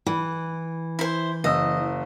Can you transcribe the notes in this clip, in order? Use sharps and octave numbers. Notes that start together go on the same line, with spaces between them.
E3
E4 C5
F#1 D#5 E6